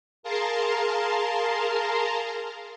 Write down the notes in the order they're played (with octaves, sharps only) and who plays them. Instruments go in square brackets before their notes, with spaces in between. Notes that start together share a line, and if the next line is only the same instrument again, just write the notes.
[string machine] G#4 A#4 F5 A5 A#5 C6